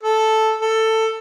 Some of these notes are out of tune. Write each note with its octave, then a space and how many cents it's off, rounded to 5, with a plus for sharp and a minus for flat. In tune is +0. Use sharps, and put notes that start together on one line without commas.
A4 -5
A4 +15